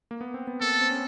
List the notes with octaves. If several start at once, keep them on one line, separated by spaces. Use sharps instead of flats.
A#3
B3
C4
B3
A#3 A4
C4
C#4